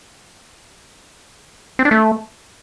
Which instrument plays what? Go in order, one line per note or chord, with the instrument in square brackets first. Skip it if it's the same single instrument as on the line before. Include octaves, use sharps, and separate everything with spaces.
[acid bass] C4
D4
A3